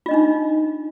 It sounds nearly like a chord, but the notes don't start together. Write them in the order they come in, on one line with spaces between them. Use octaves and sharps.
F4 D#5 D4 D#4